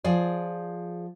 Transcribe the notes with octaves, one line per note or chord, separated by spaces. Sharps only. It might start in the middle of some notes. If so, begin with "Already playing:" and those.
F3 G#4 D5